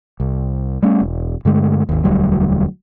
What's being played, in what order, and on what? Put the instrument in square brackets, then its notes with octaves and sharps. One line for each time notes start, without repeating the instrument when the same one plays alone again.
[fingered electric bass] C2
G3 A3 C#4
E1
G2 D3 G#3 A3
G#1 D#2
E1 D2 F#3 G3